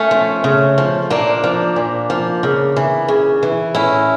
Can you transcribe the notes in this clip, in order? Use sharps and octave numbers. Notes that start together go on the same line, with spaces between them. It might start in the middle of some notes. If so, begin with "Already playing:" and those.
Already playing: A3 C#4
F3
C#3
F3
A#2 A#3 D4
F3
A#2
F3
C#3
E3
C#3
E3
A2 C#4 E4